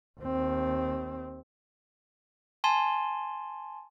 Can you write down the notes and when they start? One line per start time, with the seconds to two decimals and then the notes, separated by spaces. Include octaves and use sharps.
0.21 D#2 C4
2.64 G#5 A5 C6